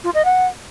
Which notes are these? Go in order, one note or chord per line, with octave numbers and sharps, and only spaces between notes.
F4
D#5
F#5